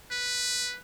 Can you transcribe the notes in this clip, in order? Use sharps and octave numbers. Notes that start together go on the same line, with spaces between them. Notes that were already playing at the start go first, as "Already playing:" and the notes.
B4